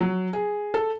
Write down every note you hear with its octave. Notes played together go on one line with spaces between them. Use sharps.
F#3
G#4
A4